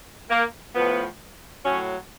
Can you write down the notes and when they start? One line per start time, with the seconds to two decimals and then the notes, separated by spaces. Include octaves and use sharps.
0.30 A#3
0.75 A2 F3 B3
1.65 A2 F#3 C#4